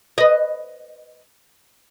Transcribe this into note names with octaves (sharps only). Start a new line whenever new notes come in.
B4 D#5